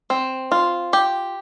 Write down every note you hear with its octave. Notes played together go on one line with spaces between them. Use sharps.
C4
F4
G4